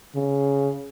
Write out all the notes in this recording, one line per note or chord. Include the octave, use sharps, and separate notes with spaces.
C#3